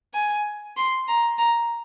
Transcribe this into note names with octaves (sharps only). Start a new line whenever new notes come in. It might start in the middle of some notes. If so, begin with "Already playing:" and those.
G#5
C6
A#5
A#5